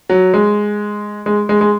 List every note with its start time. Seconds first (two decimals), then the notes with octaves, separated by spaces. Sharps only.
0.09 F#3
0.34 G#3
1.26 G#3
1.49 G#3
1.61 G#3